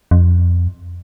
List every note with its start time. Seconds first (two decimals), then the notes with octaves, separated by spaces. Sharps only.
0.11 F2